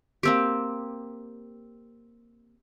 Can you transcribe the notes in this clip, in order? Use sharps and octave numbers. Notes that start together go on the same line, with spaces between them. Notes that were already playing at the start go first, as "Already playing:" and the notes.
A#3 C4 G4